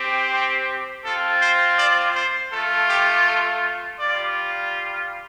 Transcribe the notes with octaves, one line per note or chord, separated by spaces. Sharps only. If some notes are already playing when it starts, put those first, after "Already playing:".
Already playing: C4 G4
C5
C4 F4 A4
C5
D5
C5
A3 F4 A4
G4
A4
G3 F4 D5